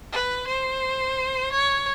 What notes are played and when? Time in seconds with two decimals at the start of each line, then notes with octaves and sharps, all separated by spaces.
0.13 B4
0.48 C5
1.53 C#5